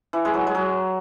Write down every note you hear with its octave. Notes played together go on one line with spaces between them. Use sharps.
E3
G#3
F#3
G#3
F#3